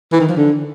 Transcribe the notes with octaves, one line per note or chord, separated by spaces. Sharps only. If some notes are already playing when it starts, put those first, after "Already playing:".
E3
D#3
F3
D3